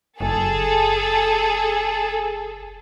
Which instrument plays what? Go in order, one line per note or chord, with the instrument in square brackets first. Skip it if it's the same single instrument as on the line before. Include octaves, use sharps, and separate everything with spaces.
[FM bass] F#1 [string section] G#4 A4